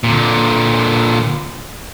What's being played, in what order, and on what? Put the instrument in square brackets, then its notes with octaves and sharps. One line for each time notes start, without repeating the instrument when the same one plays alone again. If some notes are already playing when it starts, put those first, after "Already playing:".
[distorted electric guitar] A#2 D3